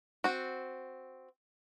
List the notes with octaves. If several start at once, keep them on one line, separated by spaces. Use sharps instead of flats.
C4 F#4